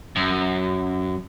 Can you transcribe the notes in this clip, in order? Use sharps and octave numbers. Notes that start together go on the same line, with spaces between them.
F#2